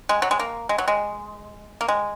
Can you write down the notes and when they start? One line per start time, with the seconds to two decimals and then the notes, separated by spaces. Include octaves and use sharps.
0.09 G#3
0.22 F#3
0.31 G#3
0.39 A#3
0.69 G#3
0.78 F#3
0.88 G#3
1.81 A#3
1.88 G#3